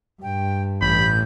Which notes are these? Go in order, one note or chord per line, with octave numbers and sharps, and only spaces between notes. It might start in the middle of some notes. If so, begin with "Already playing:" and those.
G2 G5
A1 B5 G6